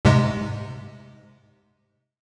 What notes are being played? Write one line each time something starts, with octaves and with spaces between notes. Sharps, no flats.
G#2 C3 G#3